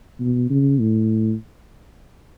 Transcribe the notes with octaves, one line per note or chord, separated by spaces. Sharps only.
B2
C#3
A2